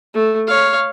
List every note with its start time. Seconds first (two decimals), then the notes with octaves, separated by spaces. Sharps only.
0.14 A3
0.47 C#5 F5